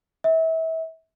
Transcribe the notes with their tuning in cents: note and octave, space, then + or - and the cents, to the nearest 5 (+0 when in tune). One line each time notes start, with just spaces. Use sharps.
E5 -30